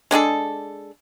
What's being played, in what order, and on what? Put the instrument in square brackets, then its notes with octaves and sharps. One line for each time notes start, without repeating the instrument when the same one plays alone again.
[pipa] G#3 D4 G#4 A4